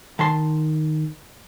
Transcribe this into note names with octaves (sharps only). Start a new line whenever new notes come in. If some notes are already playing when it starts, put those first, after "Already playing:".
D#3 A5 C6